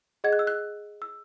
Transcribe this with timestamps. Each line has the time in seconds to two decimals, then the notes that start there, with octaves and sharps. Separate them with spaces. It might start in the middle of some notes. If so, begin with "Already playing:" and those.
0.24 G#4 D#5 F#5 G#6
0.33 F#6
0.39 E6
0.47 F#6
1.02 E6